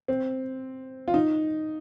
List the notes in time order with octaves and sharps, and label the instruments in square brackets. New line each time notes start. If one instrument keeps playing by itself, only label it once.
[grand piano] C4
F4
D#4